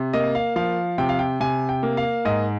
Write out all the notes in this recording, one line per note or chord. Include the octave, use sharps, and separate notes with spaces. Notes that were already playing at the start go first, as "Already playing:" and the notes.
Already playing: C3
A#3 D#5
F5
F3 F5
C3 G5
F5
G5
C3 G#5
G5
A#3
F5
G#2 D#5